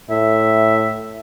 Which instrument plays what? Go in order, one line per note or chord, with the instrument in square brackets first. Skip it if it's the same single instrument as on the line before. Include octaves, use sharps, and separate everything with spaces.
[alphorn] A2 [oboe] E5